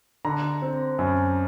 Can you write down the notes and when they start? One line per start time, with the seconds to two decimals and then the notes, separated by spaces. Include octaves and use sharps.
0.25 D3 A#5
0.62 C4
0.99 F#2